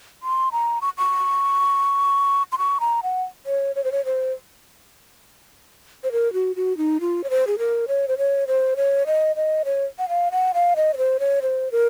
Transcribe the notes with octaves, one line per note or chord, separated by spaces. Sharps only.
C6
A#5
C#6
C#6
C6
C#6
A#5
F#5
C#5
C#5
C5
C#5
C5
C5
A#4
F#4
F#4
D#4
F4
C#5
C5
G#4
A#4
C#5
C5
C#5
C5
C#5
D#5
D#5
C#5
F#5
F5
F#5
F5
D#5
C#5
C5
C#5
C5
A#4